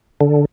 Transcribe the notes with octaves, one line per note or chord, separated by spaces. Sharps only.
D3